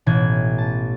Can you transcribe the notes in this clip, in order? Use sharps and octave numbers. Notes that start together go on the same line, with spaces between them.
A1 B2 E3 G#6
A5